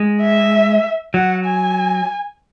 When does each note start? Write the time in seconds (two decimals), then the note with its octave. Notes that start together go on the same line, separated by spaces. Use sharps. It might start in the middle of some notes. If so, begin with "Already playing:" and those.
Already playing: G#3
0.21 E5
1.14 F#3 F#5
1.45 G#5